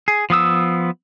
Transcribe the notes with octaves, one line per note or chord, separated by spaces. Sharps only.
G#4
F3 B3 D#6 E6